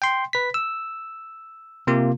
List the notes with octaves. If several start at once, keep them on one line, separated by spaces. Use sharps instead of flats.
G5 C6
B4 B6
E6
C3 A#3 F4